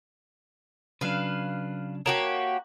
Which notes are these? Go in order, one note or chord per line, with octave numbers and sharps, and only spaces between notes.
C#3 F#3 D4 B4 F5
A#3 F#4 G4 C#5 A5 A#5